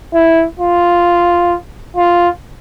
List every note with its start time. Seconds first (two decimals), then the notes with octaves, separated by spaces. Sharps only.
0.13 E4
0.60 F4
1.96 F4